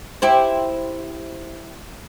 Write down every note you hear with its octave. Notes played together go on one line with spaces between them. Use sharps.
E4 G4 C5